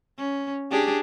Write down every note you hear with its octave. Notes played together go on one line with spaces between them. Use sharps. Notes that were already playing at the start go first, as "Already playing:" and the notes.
C#4
D4 G4 G#4